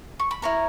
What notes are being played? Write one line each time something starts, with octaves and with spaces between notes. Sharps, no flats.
C#6
B5
E4 A#4 C#5 A#5